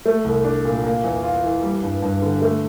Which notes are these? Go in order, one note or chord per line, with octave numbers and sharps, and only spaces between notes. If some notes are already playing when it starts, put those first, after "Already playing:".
A3
C2
D4
A#2
A#3
E2
F4
E3
G3
G2
G2
D3
A3